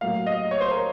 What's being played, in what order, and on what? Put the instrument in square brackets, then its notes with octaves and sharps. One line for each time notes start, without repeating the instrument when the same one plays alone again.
[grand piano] A2 F#3 A#3 F5
D#5
C#5
C5
A#4